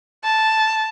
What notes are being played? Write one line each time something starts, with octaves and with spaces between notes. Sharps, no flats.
A5